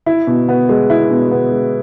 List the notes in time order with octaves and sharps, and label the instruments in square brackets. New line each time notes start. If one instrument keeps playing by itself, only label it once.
[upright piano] E4
B2
B3
G#3
E4
B2
B3
G#3